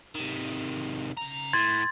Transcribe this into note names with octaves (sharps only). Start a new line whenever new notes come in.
C3 D#3
C#3 A#5
A2 C6 G#6 A6